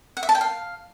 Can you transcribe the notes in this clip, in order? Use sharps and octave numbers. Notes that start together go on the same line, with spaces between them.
F#5
E5
A5
G5
F5